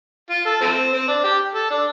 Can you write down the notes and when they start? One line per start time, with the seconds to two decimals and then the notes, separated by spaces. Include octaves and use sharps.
0.30 F4
0.46 A4
0.61 F3 A3 C4
0.93 C4
1.08 D4
1.24 G4
1.55 A4
1.71 D4